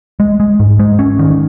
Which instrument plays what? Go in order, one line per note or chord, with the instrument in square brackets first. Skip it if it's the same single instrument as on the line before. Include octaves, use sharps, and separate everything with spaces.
[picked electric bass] G#3
G#3
G#2
G#3
C#4
D#3